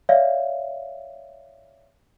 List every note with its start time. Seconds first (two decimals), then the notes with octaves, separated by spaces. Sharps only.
0.09 C#5 D5 E5 F5